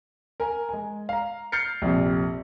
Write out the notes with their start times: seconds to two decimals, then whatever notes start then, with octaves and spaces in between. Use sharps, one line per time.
0.40 A#4 G#5 A#5
0.69 G#3 G#5
1.09 F5 A#5
1.52 F6 G6 A6 C7 C#7
1.82 A#1 F2 C3